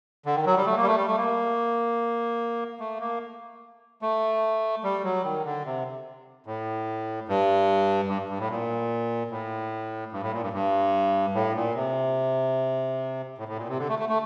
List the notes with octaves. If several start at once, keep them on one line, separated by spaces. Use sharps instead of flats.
D3
D#3
F#3
G3
A3
A#3
G3
A3
G3
A3
A#3
A3
A#3
A3
G3
F#3
D#3
D3
C3
A2
G2
G2
G2
A2
A#2
A2
G2
A2
A#2
G2
G2
A2
A#2
C3
A2
A2
A#2
C3
D3
A3
A3
A3